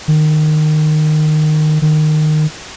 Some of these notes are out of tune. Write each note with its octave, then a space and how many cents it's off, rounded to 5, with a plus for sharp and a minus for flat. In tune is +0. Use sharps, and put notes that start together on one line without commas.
D#3 -20
D#3 -20